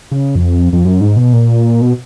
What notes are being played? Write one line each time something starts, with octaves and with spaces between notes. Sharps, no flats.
C#3
F2
F2
F#2
G#2
B2
A#2
B2